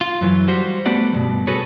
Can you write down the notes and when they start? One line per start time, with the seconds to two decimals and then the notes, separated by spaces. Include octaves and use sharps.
0.01 F4
0.21 F#2 E3 F#3
0.48 G3 F#4 C5
0.86 G3 A3 B3 F#4 D5 F#5
1.12 E2 G2 B2
1.47 F#4 G#4 A4 B4 C#5